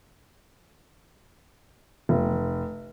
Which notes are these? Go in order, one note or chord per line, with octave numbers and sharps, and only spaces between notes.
F1